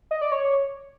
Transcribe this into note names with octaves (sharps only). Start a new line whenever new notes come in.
D#5
D5
C#5